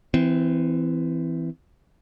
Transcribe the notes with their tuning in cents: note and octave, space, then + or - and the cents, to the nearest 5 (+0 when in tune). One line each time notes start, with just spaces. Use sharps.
E3 +0 C4 -25